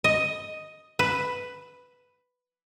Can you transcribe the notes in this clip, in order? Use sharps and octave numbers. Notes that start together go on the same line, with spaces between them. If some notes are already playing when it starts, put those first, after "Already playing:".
D#5
B4